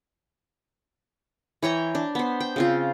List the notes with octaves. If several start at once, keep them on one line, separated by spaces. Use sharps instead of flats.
E3 C#5 G5 A#5
D4
B3 C5
G5
C#3 C4 F4